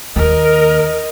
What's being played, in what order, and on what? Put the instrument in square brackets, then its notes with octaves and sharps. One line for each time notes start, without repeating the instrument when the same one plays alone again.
[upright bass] D#2 [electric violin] A#4 [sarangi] D#5